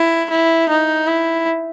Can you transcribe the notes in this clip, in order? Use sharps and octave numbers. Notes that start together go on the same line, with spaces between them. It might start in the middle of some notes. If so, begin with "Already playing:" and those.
Already playing: E4
E4
D#4
E4